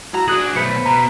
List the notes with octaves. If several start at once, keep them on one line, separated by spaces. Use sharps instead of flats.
E4 F#4 A#5
D4 F#4 G#4 D#6 F#6 F#7
B1 A3 B4 C5 C#7
B2 A#5